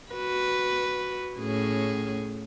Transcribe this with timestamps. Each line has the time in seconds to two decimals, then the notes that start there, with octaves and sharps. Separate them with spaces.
0.13 F#4 B4
1.39 A2 C#4 G#4